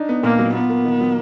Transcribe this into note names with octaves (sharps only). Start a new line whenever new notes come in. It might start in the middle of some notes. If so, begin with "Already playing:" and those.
Already playing: D4 D#4
B3
A#2 A#3
F#3
B3 F4
A#3
D#3
F#3